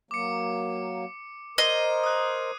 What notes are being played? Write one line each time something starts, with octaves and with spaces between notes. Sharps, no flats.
F#3 A#3 D6 C#7
A#4 C5 D#5 G#6 C7 D#7
D#6 F#6